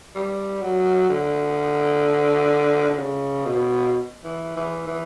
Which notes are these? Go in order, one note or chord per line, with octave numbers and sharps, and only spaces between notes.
G3
F#3
D3
D3
C#3
B2
E3
E3
E3